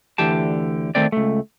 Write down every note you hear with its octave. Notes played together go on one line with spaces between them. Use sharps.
D2 D3 E3 G4 A5
D#3 A3 C4 D5
C#2 A3